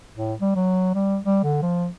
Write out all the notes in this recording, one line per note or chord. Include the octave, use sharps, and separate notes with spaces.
A2
G3
F#3
G3
G3
D3
F3